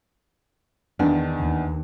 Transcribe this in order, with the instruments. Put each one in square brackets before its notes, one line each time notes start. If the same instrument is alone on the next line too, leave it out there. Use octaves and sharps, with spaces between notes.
[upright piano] E2 D#3 [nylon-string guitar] D4
[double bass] D#2